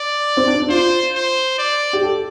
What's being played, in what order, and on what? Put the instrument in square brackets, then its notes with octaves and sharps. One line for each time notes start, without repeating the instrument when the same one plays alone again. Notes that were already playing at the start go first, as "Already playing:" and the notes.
Already playing: [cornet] D5
[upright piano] C4
D4
D4
[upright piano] F4 [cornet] C5
[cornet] C5
D5
[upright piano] G4
A4